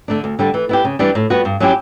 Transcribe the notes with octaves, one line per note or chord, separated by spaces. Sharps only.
D3 A3 D4
D2
D3 G3 D4
E3
B3 E4 G4
C#3
E3 G3 D4 G4
A2
G3 B3 F#4
G2
F#3 C#4 E4 G4